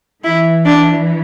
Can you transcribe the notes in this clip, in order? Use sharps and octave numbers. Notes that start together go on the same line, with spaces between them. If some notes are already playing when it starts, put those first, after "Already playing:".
E3 E4
D4